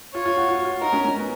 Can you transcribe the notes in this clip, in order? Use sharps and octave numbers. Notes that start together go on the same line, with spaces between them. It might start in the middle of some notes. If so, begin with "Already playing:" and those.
F4 C#5
F4
F#4
F4
F4
D#4 A#4
C#4
C#4
B3